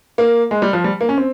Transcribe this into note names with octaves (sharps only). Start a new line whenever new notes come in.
A#3
G#3
G3
F3
G3
A#3
C#4
C4